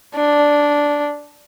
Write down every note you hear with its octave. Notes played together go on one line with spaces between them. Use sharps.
D4